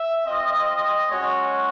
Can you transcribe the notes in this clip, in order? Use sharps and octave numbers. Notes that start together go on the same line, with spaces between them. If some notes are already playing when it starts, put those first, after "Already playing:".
Already playing: E5
C4 F4 D#5
G#3 C#4 F#4 C#5